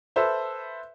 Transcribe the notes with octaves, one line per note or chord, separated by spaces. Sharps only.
A4 B4 C5 E5